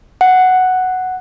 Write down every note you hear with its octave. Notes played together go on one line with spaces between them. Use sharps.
F#5